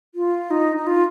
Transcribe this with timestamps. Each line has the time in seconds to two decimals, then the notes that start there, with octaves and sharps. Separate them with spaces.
0.15 F4
0.50 D#4
0.76 D#4
0.87 F4